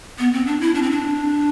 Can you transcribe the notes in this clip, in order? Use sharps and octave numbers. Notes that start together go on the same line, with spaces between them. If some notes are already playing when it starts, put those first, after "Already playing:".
B3
C4
D4
E4
D4
C4
D4